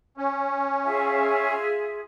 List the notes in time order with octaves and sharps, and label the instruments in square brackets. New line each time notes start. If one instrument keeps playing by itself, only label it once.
[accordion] C#4
[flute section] F4 G#4 E5